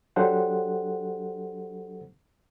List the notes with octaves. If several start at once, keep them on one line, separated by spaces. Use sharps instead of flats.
F#3 D4 G4 A4 C5 F#5